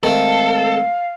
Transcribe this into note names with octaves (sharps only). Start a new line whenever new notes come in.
D#3 G#3 A3 C4 A4 F5